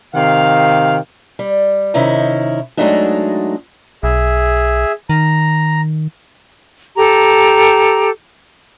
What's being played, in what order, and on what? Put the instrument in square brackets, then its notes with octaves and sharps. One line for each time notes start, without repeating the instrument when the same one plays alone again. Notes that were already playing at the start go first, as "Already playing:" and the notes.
[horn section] C3 D#3 F5
[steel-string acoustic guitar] G3
C3 D#3 C#4 D#4 E4
F#3 G#3 A3 D4 D#4 F#4
[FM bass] B1 [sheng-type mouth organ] G#4 E5
[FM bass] D#3 [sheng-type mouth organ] A#5
[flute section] G4 A4 A#5